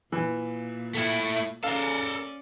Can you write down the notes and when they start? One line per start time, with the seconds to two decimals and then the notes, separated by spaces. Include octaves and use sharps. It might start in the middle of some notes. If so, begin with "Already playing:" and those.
0.12 A#2 E3
0.95 A3 E4
1.64 C#4 A4 A#4 D5 F5